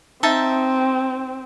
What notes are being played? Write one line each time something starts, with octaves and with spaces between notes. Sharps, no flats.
C4 D#4 E5 A5